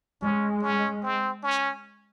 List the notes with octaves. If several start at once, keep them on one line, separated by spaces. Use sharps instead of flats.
G#3 C#4
C#4
C4
C#4